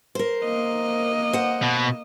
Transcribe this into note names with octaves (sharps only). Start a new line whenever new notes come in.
A#4 C5
A#3 D#5
C5 F#5
B2